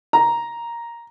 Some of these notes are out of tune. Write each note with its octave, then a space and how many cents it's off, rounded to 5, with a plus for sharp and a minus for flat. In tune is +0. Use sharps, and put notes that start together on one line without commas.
A#5 +5